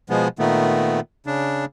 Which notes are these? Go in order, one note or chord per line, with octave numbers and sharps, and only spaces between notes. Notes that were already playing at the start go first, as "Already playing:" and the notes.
B2 F3 G#3 B3
A#2 D#3 A3 B3
C#3 D4